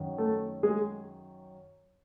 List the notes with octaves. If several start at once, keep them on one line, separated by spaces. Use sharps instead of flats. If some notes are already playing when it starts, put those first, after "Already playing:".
Already playing: F#2 D#3 F#3
A3 A4
G#3 G#4